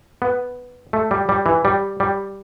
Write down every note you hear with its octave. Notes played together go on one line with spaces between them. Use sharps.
B3
A3
G3
G3
E3
G3
G3